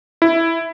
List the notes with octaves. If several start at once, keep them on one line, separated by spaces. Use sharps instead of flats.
E4